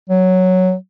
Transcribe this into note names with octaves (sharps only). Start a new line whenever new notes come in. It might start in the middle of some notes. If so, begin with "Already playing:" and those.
F#3